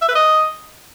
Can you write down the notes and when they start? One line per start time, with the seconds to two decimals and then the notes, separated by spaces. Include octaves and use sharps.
0.02 E5
0.08 B4
0.15 D#5